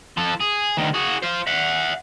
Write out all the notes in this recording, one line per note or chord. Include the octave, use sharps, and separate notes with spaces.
F3 A4
G#4
D2 D#3
F#4 G#4
C5 F5
E5 F#5